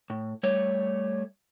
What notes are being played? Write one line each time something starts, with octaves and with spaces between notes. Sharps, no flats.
A2
G3 A3 C#5